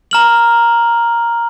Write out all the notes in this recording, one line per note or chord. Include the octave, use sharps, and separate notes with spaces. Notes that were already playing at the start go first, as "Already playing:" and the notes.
A#5 F6 F#7